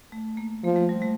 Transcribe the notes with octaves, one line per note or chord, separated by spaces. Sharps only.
A3
A#3
F3 A#3
A3
G3
A3